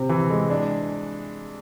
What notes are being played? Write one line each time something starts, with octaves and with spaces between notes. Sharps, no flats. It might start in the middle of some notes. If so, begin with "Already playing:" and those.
Already playing: C3 C4
E3
G#3
D4